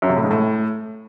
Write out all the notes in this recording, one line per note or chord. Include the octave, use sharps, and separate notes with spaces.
F#2
C3
A2
G#2
A2